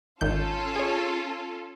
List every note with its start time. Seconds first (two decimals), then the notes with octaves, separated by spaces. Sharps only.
0.21 G#1 D#3 C#4 F4 A4 G6
0.76 G#4 C#5